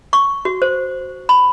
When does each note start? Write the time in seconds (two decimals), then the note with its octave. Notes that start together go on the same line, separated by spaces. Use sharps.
0.13 C#6
0.45 F#4
0.62 C5
1.29 B5